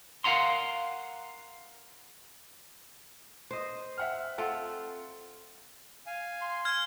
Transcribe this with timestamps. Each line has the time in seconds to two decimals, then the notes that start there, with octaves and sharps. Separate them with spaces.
0.24 A#4 F5 F#5 A#5 C6
3.51 C5 D#5
3.98 E5 F#5 F6
4.38 C4 F4 A4 F#5
6.06 F5 G#5
6.41 C6
6.65 F6 G#6